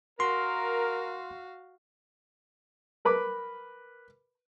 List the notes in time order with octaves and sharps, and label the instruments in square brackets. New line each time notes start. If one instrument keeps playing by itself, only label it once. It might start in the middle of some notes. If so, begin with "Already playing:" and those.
[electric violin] F#4 F5 [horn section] A#4 [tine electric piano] C6
[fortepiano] A#4 B4 B5 D6